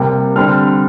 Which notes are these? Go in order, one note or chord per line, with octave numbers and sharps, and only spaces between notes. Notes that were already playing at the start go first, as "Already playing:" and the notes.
Already playing: C3 G3 A#3
D3 G3 C4 F6